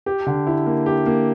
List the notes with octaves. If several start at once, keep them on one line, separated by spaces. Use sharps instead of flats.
G4
D3
E4
A#3
G4
A#3